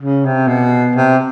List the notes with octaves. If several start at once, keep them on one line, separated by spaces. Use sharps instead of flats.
C#3
C3
B2
C3